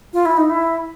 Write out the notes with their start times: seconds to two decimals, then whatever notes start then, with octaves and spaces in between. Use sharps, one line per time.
0.13 F4
0.25 E4
0.37 D#4
0.50 E4